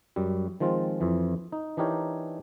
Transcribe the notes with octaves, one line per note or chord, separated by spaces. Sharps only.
F#2 G3
D#3 F3 G#3 C4 F4
F2 E3
D#4
E3 D4 D#4 G4 A#4 C#5